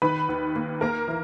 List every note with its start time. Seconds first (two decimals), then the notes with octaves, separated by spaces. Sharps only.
0.02 D#3 B4 B5
0.29 D#2
0.56 A#3
0.81 A#3 A#4 A#5
1.08 E3